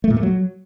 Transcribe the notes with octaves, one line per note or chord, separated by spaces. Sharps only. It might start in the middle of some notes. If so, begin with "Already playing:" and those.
A3
A#2
A3
F#3